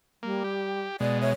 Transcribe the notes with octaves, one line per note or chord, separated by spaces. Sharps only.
G3 A#3
G4
B2 G#3 D5
C#5 E5